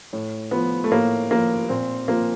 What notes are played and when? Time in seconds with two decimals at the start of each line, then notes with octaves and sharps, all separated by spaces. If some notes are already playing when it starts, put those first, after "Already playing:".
0.13 A2
0.51 F3 B3
0.84 A3
0.92 A2 A#3
1.30 F3 A#3
1.69 A#2 C4
2.08 F3 A#3